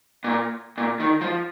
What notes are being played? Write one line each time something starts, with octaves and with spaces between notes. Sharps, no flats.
A#2
A#2
D#3
F3